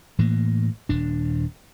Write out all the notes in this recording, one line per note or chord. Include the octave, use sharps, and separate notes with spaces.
A2 E3 A#3
D#1 D4